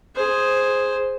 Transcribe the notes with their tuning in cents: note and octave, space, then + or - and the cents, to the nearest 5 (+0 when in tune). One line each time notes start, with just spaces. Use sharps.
G#4 +0 C5 +0